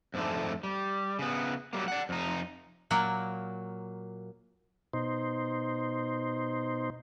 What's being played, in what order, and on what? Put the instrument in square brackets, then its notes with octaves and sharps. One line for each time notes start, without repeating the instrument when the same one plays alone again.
[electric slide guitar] F2 G#2 D3 A3
G3
C#3 B3
F#3 G3 A#3
D5 F#5
F2 D#4
[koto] A#2 F#3 A#3 F#4
[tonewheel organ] B2 D#4 C5